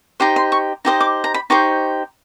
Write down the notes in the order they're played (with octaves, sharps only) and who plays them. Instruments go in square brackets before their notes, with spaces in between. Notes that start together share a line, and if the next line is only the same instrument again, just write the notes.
[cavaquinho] D#4 G4 C5 C6
C6
C#6
D#4 G4 C5 D#5
D6
A#5
B5
D#4 G4 C5 C#6